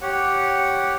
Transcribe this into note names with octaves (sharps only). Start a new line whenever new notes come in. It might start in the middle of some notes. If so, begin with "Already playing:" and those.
G4 C#5 F#5